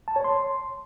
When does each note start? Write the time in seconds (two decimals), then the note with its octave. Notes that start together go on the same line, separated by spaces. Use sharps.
0.08 A5
0.16 C#5
0.24 C6